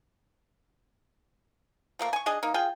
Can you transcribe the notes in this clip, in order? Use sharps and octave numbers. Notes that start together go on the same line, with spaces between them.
F3 A3 A#3
G#5 C#6
D4 G#4 D#5
A#3 D#4
F4 G#4 G5